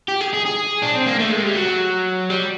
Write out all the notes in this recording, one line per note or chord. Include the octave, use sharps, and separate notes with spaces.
G4
G#4
G#4
G#4
D4
C4
A#3
A3
G#3
G3
F#3
G3